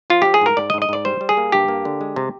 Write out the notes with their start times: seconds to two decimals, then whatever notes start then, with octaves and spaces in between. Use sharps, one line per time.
0.10 F3 F4
0.22 F3 G4
0.34 G#4
0.41 G#2 A#4
0.57 G#2 D5
0.70 D#5
0.74 G#2
0.82 D#5
0.89 G#2 D5
1.05 G3 C5
1.21 G3
1.29 G#4
1.37 A#3
1.52 G2 G4
1.68 A#3
1.85 D3
2.01 G#3
2.16 C3